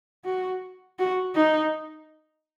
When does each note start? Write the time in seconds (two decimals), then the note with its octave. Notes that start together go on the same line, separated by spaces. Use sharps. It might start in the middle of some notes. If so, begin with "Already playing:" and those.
0.25 F#4
0.99 F#4
1.36 D#4